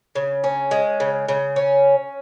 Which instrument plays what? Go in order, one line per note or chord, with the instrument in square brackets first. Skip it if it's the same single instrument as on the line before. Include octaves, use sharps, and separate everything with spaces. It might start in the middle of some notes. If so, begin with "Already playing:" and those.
[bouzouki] C#3
C#4
G#3
C#3
C#3
C#4